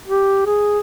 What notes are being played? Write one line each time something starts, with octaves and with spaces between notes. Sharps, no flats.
G4
G#4